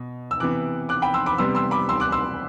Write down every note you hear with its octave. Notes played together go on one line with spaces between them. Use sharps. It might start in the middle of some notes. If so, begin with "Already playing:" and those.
Already playing: B2
E6
C3 E3 B3 D6 F#6
D6 F#6
G5 B5
C6 E6
B5 D6
C3 G3 B3 C6 E6
C6 E6
B5 D6
C6 E6
D6 F#6
C6 E6